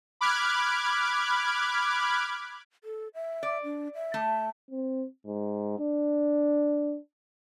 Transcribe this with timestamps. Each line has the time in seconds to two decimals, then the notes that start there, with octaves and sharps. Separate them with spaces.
0.21 B5 D6 F6 F#6 G#6
2.84 A4
3.14 E5
3.43 D5
3.64 D4
3.95 E5
4.14 A3 A5
4.71 C4
5.26 G#2
5.79 D4